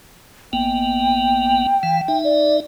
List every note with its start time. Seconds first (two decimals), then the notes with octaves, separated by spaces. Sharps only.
0.53 G#1 A#3 B3 G5
1.83 E3 F5
2.08 D#4 E5
2.24 D5